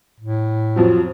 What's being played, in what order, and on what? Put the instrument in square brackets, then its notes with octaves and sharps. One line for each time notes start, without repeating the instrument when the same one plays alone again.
[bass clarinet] A2
[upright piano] F2 F3 F#3